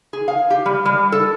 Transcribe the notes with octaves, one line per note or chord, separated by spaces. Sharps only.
G#4
F5
G4
G3
G3
A4